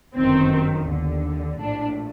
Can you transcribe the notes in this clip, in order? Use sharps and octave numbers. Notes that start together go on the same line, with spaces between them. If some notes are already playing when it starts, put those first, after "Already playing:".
G1 F#2 D#3 C4
D#2 D3
A#1 A2 D4